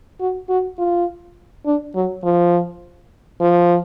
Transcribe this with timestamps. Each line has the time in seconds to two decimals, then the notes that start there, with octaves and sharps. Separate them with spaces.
0.20 F#4
0.49 F#4
0.78 F4
1.66 D4
1.95 F#3
2.24 F3
3.41 F3